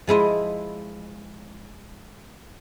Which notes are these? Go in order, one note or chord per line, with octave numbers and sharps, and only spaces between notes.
F3 G#3 E4 D#5